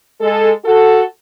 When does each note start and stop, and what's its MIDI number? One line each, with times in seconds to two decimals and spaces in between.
0.21 0.51 56
0.21 0.51 69
0.65 1.03 66
0.65 1.03 69